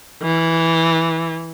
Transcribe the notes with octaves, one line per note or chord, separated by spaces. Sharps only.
E3